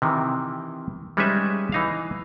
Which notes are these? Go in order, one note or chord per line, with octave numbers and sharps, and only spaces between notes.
C3 D#3 E3
G3 G#3 C#4 D#4 B4 E5
E3 D#4 F5